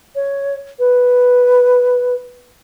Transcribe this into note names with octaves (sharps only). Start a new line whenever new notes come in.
C#5
B4